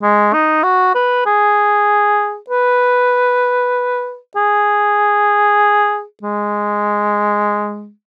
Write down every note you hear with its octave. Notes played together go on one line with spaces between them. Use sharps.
G#3
D#4
F#4
B4
G#4
B4
G#4
G#3